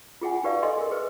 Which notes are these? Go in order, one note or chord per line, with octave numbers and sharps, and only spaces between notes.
F4 G#4 F#5 G#5
D#4 F#4 G4 B4 D5 F5
A4 D#5 E5 G#5 C6
G#4 A#4
G#4 B4 C5